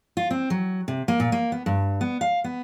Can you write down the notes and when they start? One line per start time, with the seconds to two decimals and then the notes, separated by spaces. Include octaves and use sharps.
0.17 F4
0.30 C4
0.50 F#3
0.88 C3
1.08 A#3
1.20 A#2
1.32 A#3
1.52 B3
1.66 G2
2.01 B3
2.21 F5
2.44 B3